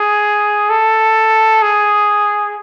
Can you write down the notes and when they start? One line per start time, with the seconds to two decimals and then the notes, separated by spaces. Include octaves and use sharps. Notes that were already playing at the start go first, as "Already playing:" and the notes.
Already playing: G#4
0.70 A4
1.62 G#4